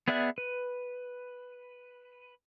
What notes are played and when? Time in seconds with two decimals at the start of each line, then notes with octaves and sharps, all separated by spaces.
0.08 B3 G#4 D5 E5 F#6
0.38 B4